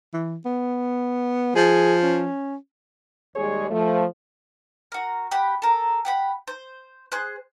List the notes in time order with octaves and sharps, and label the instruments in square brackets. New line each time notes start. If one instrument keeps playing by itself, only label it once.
[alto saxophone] E3
B3
[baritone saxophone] F3 [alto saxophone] G#4
[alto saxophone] C#4
[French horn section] D#2 G3 G#3 G#4 C#5
F3 A3
[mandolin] F#4 A#4
G4 F#5 B5
A4 A#4
G4 F#5 B5
C5
G#4 C5 F#6